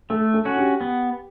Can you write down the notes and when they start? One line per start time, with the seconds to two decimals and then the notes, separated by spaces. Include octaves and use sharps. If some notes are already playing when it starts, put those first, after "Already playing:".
0.10 A3 A4
0.34 A4
0.45 C#4 F#4
0.57 G4
0.81 B3